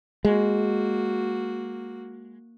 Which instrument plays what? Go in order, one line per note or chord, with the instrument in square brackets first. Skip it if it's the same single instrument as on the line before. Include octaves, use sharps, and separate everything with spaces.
[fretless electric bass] G#3 [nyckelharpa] A#3 F#4